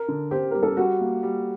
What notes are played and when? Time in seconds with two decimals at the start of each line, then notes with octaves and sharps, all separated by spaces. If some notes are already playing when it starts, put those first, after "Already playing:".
Already playing: A#4
0.08 D3
0.31 G4 C5
0.51 G3 A#4
0.63 A4
0.77 G3 F#4
1.01 A#3
1.23 G3